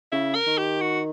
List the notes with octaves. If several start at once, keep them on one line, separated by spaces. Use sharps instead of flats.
C#3 E4
A#4
D#3
G4
F#4